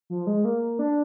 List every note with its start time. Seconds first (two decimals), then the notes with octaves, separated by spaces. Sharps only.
0.10 F3
0.27 G#3
0.45 A#3
0.79 D4